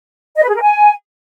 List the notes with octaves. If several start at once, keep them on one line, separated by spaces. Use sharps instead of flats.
D#5
B4
G#4
A#4
G#5